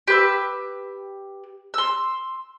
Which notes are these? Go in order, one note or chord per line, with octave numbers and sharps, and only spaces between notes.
G4 B4 E6
C6 E6